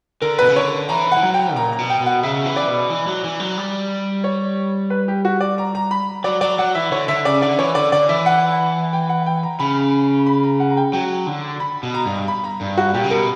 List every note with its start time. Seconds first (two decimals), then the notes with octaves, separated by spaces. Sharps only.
0.22 D3 A#4
0.39 B2 B4
0.49 C#3
0.56 D3 C#5
0.89 E3 A#5
1.12 F#5
1.17 E3
1.23 F#3
1.34 G5
1.56 A#2 A#5
1.73 A#5
1.78 B2
1.90 G5
2.01 B2
2.06 F#5
2.23 C#3 E5
2.46 E3
2.56 D5
2.68 B2
2.90 E3
3.07 F#3
3.24 E3
3.40 F#3
3.57 G3
4.24 C#5
4.90 B4
5.08 G4
5.25 F#4
5.41 D5
5.58 A#5
5.75 A#5
5.91 B5
6.24 F#3 D5
6.41 F#3 D5
6.59 F#3 F#5
6.75 E3 E5
6.92 D3 C#5
7.08 D3 E5
7.25 C#3 D5
7.42 D3 D5
7.59 E3 C#5
7.75 D3 D5
7.92 D3 D5
8.09 E3 E5
8.26 F#5
8.93 G5
9.09 F#5
9.26 G5
9.43 A#5
9.59 C#3 B5
10.26 B5
10.43 A#5
10.60 F#5
10.70 A#5
10.77 G5
10.93 F#3 G5
11.27 D3
11.60 B5
11.83 B2
11.94 A#5
12.06 G2
12.28 B5
12.44 A#5
12.61 G2
12.77 F#4
12.94 A#2 G4
13.04 C#3
13.11 B2 A#4